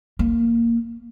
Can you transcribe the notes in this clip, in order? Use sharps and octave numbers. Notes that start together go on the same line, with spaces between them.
A#3